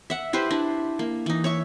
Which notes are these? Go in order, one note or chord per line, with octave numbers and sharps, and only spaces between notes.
E5 F#5
E4 G4 B4 C5
D4 E4
A#3
E3 D#4
C#5 E5 C#6